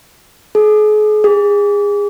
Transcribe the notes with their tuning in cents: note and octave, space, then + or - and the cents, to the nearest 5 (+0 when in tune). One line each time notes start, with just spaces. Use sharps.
G#4 +40
G#4 -25